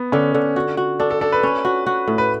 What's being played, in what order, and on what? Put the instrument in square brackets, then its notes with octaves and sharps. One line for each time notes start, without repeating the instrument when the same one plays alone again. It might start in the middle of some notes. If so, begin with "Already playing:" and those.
Already playing: [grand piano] B3
[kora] D3 [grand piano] C#4
[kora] D3
F#4
F#4
[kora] D4 [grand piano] A4
[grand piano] A4
[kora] D4 [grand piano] A4
[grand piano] B4
[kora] C#4
F#4
F#4
A2
[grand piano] B4